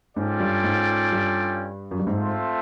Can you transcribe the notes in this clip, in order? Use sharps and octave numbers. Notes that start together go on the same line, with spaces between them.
G#2 C#4 F4 A4 D5 G5
G2
G#2
G2
F#2
G2
G#2 A3 C4 F4